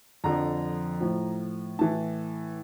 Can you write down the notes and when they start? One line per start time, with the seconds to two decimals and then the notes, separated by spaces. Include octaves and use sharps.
0.24 F2 D3 F3 A#5
1.01 A2 F3
1.79 A2 E3 A5